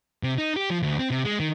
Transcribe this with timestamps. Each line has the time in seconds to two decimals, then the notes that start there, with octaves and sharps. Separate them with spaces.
0.23 C3
0.38 D#4
0.57 G4
0.70 F3
0.83 D2
0.99 C4
1.11 C3
1.25 G#3
1.40 D#3